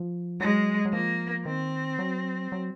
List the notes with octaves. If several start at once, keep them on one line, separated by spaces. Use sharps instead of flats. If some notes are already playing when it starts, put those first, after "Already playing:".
Already playing: F3
F#3 G#3
F#3
F3 A#3
D#3 C4
F#3
F#3